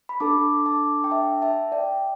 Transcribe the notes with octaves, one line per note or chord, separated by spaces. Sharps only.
B5
D4 A4 A5 D6
A5 D6
G5
E5 A5
E5 A5
D5 G5